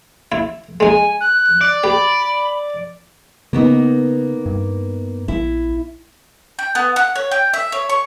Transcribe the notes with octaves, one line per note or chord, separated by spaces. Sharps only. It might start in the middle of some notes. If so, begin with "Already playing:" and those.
E4
G#3 D#4 G#5
F#6
D5
G4 B5
C#3 A#3 B3 D#4
G2
A#1 E4
G5
B3
F#5
C#5
G5
E5
C#5
C#6